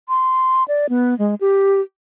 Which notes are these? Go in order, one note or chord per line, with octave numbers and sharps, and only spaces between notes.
C6
D5
B3
G#3
G4